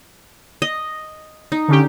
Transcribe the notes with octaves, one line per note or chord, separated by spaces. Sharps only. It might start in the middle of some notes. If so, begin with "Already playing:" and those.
D#5
D#4
D3 C#4 G4